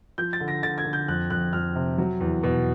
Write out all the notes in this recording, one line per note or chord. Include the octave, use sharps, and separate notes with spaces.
F3 G6
A6
D3
A#6
D3 A6
G#6
D3
G6
F2 F#6
F2 F#6
F2 F6
C3
F#3
E2
B2